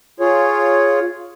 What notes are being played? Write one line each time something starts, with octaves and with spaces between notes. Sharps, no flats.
F4 G#4 C#5